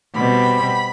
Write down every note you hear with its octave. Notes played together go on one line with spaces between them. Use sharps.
B2 G3 C4 B5